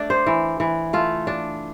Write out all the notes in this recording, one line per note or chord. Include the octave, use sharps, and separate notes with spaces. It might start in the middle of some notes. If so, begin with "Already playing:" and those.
Already playing: A3 D4 D5
C5
E3
E3
A3 F4
D4